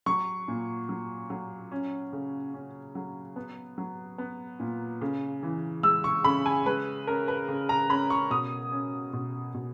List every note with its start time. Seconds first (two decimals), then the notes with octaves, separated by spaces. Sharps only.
0.06 F#3 C#6
0.48 A#2
0.89 F#3
1.30 F#3
1.72 C#4
2.13 C#3
2.54 C#4
2.95 F#3
3.36 B3
3.78 F#3
4.18 B3
4.60 A#2
5.01 C#3
5.43 E3
5.83 G#3 E6
6.04 C#6
6.24 C#3 B5
6.46 G#5
6.66 G#3 B4
7.07 C#4 A#4
7.28 B4
7.48 C#3
7.69 A#5
7.89 C#4 B5
8.10 C#6
8.30 B2 D#6
8.72 C#4
9.13 B2
9.54 B2